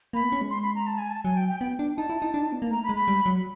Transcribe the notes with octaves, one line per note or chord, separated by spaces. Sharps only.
A#3 B5
B3
C#4
G#3
C6
B5
A#5
A5
G#5
A5
F#3 G#5
G5
G5
B3 G5
D4
D#4 A5
E4
D#4
D4
D#4
B3
A#3
A3 A#5
B5
G#3
B5
G3
F#3